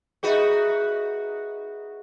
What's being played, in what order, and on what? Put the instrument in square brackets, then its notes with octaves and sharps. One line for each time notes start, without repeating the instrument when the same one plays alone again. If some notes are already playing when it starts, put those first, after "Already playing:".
[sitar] D#4 F#4 B4 [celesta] G#4 D#5 E5